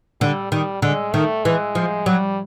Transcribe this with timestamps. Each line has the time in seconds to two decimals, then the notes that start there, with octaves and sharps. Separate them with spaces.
0.21 D3 G3
0.52 D#3 G3
0.82 D3 G#3
1.14 D#3 A3
1.45 E3 G#3
1.75 F3
2.06 F#3 G3